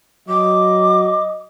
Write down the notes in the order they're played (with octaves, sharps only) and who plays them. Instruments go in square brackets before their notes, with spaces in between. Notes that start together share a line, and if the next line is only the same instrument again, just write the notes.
[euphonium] F#3 [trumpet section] D#5 [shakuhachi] D6